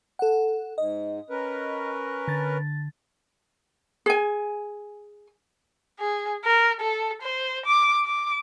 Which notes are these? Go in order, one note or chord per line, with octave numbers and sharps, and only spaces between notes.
A4 F#5
G#2 D#5
C#4 A#4 B4
D3 A6
G#4 G#5
G#4
A#4
A4
C5
D6
D6